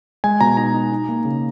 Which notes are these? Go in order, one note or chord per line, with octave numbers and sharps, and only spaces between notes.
G#3 G#5
B2 A#5
D#4 A#5
D#4
D#4
A#3
C#3